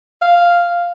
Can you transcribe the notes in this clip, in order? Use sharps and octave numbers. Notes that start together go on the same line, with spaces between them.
F5